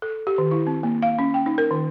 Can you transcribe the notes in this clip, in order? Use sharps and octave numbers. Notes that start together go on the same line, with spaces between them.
A4
G4
D#3
E4
C4
A#3
F5
C#4
G5
D#4
A#4
D#3